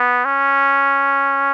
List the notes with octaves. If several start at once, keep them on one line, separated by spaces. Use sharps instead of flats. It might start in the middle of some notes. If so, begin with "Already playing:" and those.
Already playing: B3
C#4